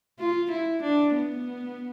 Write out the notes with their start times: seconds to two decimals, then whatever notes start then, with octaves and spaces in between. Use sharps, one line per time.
0.19 F4
0.51 E4
0.83 D4
1.14 B3